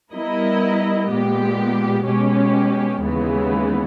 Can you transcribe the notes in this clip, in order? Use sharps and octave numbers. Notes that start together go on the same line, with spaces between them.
G3 B3 E4 A#4 D#5
A#2 G#3 B3 G4
B2 G#3 C#4 G4
D#2 C#3 E3 G#3 B3